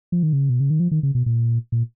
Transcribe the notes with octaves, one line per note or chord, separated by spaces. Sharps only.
F3
D#3
C#3
B2
C#3
D#3
F3
D#3
C#3
B2
A#2
A#2